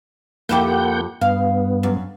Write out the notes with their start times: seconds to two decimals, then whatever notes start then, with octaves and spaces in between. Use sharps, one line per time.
0.49 F2 A#3 E4 G4 F#5 G6
1.21 G2 B3 F5
1.83 F#2